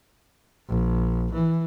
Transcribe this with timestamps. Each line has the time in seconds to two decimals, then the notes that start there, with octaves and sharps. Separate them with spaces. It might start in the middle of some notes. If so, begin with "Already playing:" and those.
0.68 A#1
1.33 E3